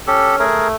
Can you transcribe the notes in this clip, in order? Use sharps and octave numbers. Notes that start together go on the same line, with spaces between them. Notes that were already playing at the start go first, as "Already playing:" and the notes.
C#4 G4 A4
A3 G#4 A#4